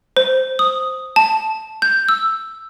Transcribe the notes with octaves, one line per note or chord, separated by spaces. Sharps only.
C5
D#6
A5
G6
E6